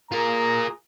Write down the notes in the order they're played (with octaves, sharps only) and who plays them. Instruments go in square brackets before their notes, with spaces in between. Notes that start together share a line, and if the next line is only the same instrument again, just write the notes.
[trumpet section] A#3 G#4 A#5 [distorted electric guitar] F4 A#4